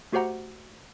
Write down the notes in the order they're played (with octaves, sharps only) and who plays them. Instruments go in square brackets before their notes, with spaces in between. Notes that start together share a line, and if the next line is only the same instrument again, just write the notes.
[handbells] A3 F#4 G4 C5 F#5 A#5